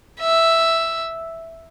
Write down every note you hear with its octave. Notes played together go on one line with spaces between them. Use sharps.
E5